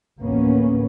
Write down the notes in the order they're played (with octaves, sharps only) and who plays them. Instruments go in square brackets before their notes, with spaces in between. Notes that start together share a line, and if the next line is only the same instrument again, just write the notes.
[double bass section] A1 D2 A#3 B3 C#4